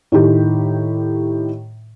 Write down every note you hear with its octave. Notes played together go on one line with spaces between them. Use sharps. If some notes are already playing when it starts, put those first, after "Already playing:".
A2 D#3 G4